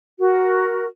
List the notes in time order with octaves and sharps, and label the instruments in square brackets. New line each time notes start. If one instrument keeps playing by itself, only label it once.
[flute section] F#4 A#4